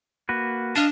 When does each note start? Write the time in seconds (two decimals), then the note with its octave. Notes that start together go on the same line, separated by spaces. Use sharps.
0.29 A#3 F#4 B4
0.76 D4 D#5 F5 A5